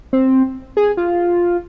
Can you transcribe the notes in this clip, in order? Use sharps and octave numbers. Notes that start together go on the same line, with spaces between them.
C4
G#4
F4